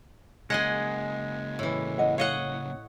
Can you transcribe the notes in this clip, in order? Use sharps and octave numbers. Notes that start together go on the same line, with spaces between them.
C#3 G#3 A#3 G#4 D#5 F#5
A2 E3
D#5 F#5
C#5 D#5 F5 F#5